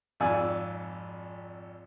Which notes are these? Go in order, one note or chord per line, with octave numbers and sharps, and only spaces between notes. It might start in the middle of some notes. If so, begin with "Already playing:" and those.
G#1 F2 D5 G#5 E6